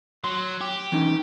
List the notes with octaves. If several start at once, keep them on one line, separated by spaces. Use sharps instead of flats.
F#3 C6
G4
E3 C#4 D#4